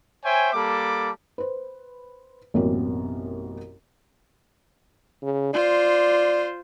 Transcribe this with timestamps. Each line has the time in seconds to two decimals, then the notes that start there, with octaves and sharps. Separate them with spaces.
0.24 C5 C#5 E5 G5 G#5
0.54 G3 A#3 A4 A5 B5 D6
1.38 B4 C5
2.54 A1 F#2 B2 A#3 C4 A#4
5.23 C#3
5.53 F4 C5 D5